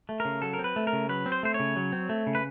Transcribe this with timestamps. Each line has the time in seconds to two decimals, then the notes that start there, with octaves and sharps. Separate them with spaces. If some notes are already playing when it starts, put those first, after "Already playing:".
0.09 A3
0.20 A#4
0.25 C#3
0.42 F#3 A4
0.53 A#4
0.59 C4
0.64 B4
0.76 A3
0.87 A#4
0.93 C#3
1.09 F#3 B4
1.26 C4
1.32 C5
1.43 A3 C5
1.54 C#5
1.60 C#3
1.76 F#3
1.92 C4
2.09 A3
2.27 C#3
2.35 B4